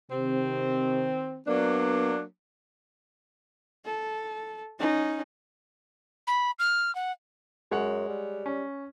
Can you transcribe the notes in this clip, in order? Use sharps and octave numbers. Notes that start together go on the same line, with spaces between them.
C3 D#3 C4
F#3 A#3 B3 D4
A4
C#4 D#4
B5
F6
F#5
F#2 G#3 C#5 F#5
G3
C#4